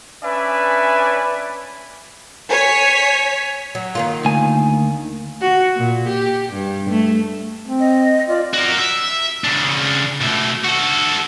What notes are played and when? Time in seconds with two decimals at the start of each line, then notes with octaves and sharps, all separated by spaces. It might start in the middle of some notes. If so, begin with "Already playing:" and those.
0.24 C#4 D4 B4 D5 E5 G#5
2.50 C#5 G#5 B6
3.75 F#3
3.95 D#3 A#3 F4
4.25 D2 G#5
5.41 F#4
5.76 A#2
6.08 G4
6.52 G2
6.89 A3
7.65 C4
7.80 D#5
8.29 F4 D5
8.54 F#4 A#4
8.79 E5
9.44 C#3 D4
10.21 B2 A3
10.64 F#4 A4